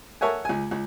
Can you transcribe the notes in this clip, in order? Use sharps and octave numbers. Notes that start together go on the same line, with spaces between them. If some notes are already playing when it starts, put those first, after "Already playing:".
A4 A#4 C#5 E5 F#5 G#5
C#2 G#5
C#2